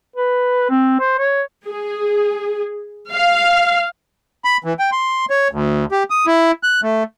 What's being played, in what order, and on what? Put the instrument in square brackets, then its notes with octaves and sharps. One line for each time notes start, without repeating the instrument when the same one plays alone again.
[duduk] B4
C4
C5
C#5
[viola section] G#4
F5
[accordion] B5
E3
G5
C6
C#5
D2
G4
D#6
E4
F#6
A3